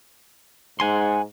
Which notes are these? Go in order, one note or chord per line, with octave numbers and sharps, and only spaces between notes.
G#2 F#5 G#5 C6